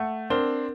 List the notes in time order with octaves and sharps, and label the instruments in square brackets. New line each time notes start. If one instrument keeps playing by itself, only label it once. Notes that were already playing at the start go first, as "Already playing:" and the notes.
Already playing: [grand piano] A3 [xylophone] F#5
[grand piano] C4 D4 [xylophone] A#4